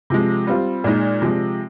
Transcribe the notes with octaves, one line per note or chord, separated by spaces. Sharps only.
C3 F3 G#3
G3 C4 F4
A#2 G#3 D#4
C3 F3 G#3